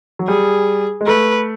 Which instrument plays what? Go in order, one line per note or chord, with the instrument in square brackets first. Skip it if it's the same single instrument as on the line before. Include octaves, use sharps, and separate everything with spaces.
[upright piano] F#3
[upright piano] G3 [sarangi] G#4
[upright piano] G#3
[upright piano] A3 [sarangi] B4